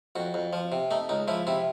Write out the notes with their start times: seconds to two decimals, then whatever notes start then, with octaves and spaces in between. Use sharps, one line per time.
0.16 F2 F#4
0.34 F2
0.53 F3
0.72 C3
0.91 A3 D#4
1.09 C#2 D#4
1.28 F3 E4
1.47 C3 E4